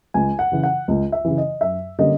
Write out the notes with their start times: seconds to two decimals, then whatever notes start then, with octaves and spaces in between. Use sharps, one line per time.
0.14 C#2 G#5
0.39 F#5
0.52 C#3 E3
0.63 F#5
0.88 C#2
1.12 E5
1.25 C#3 E3
1.38 D#5
1.61 F#2 E5
1.98 D3 G3 A#3 C#4 D#5